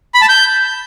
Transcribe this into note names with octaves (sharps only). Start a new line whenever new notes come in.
B5
A5
G6